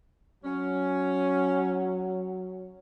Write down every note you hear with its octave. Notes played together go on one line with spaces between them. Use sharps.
F#3 C#4